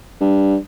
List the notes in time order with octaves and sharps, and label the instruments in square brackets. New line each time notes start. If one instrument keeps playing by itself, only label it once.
[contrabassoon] G2